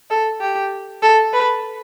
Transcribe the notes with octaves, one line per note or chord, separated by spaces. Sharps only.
A4
G4
A4
B4